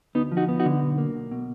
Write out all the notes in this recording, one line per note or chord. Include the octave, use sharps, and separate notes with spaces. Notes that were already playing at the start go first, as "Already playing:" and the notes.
D2 B3 D#4
F3
D#4 F#4
B3
D#4 F#4
D3
B1
A#3
B1
B2